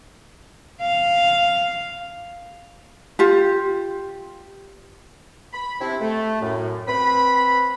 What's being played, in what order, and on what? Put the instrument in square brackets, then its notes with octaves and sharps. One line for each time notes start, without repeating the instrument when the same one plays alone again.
[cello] F5
[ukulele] F4 G4
[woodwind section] B5
C3 C4 D4 E4
A3
F#2 A2
C4 B4 B5